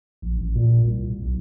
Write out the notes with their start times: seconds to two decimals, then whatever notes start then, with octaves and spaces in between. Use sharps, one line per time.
0.22 A#1
0.39 A1
0.55 A#2
0.84 C2
1.23 B1